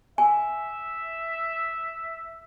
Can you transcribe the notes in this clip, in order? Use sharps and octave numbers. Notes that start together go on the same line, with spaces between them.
E5 G#5